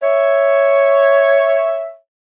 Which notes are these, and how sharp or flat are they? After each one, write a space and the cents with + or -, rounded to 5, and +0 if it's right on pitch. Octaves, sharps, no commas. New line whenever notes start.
C#5 +0 E5 +0